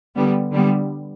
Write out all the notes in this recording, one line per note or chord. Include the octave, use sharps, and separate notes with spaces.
D3 G3 B3
D3 G3 B3